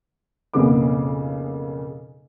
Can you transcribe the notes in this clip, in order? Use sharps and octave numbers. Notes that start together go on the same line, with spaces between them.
B1 F2 C#3 A#3 B3 D6